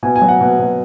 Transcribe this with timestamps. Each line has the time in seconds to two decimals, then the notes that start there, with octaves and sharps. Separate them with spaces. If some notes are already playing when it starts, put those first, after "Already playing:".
0.03 B2 G#5
0.16 G#5
0.21 F#3
0.28 F#5
0.41 B2
0.59 B2